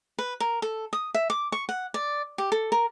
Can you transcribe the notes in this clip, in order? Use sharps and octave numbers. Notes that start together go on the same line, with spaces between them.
B4
A#4
A4
D#6
E5
D6
C#6
F#5
D5
G4
A4
A#4